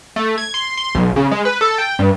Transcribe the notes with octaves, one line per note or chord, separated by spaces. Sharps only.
A3
G#6
C6
C6
B1
C#3
G#3
B4
A4
G5
G2